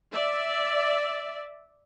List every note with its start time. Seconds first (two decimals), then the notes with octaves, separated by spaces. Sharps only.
0.12 D5 E5